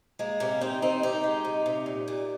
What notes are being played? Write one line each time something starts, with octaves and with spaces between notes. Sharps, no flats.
G#3 A#3
C3 A#3 C#4
C3 C4 D#4
D#3 C4 D#4
C3 D#4 G4
G#3
C3
C3
A#2
A#2